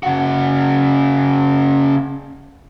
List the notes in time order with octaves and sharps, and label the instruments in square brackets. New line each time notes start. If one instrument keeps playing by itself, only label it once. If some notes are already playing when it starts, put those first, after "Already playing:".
[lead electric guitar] C#3 F#4